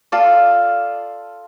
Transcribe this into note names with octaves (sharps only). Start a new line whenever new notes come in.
F4 A4 D5 F5